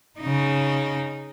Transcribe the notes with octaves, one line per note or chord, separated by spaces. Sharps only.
C#3 D#4